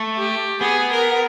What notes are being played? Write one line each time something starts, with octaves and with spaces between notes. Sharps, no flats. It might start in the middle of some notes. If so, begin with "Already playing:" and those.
Already playing: A3
G4
B3 G#4
A#4